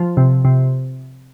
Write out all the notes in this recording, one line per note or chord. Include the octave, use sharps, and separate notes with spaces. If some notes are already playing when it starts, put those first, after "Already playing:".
Already playing: F3
C3
C3